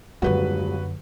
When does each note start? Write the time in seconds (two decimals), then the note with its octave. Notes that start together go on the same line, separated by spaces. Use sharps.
0.22 D#1 G#1 F#2 D3 F#4 B4